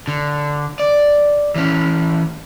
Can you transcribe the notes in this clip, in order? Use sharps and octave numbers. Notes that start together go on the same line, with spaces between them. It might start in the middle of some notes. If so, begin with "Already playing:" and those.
D3
D5
E3 C#4